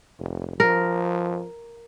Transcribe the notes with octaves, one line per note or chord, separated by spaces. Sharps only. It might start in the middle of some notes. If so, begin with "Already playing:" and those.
F1
F3 A#4